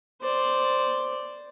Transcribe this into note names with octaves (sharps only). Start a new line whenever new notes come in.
C5 D5